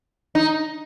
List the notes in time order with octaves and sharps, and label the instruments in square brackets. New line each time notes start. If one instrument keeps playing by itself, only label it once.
[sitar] D#4